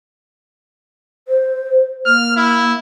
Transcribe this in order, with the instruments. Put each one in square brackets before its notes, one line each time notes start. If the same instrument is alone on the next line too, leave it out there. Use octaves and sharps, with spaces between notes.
[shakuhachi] C5
[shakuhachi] A#3 [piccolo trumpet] F6
[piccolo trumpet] E4